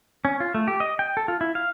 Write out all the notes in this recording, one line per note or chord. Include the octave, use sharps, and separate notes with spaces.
C#4
F4
A3
G4
D#5
G5
A4
F4
E4
F5